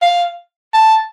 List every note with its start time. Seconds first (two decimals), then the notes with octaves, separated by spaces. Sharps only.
0.02 F5
0.73 A5